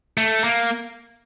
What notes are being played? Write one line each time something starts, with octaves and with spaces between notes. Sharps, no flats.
A3
A#3